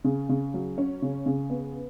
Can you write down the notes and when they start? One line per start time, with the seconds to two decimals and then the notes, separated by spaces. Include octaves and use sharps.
0.04 C#3
0.29 C#3
0.54 F#3
0.78 C#4
1.02 C#3
1.26 C#3
1.50 B3